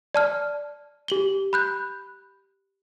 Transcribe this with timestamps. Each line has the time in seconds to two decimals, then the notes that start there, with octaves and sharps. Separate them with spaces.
0.14 D5 A5 F6
1.08 G4 F#7 G7
1.53 B5 F#6 G6